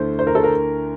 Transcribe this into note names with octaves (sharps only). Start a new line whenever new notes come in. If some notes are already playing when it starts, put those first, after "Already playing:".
Already playing: D2 D3 A3 E4 C5
C5
A#4
A4
A#4